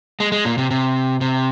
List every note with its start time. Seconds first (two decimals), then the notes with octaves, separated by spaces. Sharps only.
0.20 G#3
0.32 G#3
0.45 A#2
0.58 C3
0.71 C3
1.21 C3